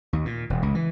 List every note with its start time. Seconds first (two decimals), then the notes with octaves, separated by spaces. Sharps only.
0.13 D#2
0.25 A#2
0.50 E1
0.63 C#2
0.75 E3